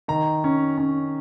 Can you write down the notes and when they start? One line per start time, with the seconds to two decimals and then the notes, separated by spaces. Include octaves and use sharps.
0.08 D#3 A#5
0.44 C#4
0.78 C#4